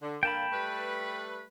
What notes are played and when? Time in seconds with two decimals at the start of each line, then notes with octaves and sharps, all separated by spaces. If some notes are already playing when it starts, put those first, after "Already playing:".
0.02 D3
0.23 D3 A#3 G5 A5 B5
0.52 G3 A3 B4